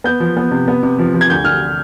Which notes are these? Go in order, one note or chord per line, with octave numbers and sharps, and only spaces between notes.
B3 G6
F3
B3
C3
B3
C3
F3
F3
G#6
D2 G6
D2 F6